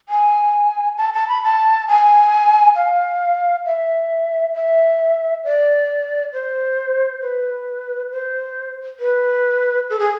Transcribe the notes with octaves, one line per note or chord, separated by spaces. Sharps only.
G#5
A5
A5
B5
A5
G#5
F5
E5
E5
D5
C5
B4
C5
B4
A4
G#4